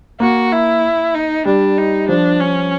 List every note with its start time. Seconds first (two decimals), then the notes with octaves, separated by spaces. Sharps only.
0.20 A#3 F#4
0.52 E4
1.14 D#4
1.46 G3 D4
1.78 D#4
2.08 F3 D4
2.40 C#4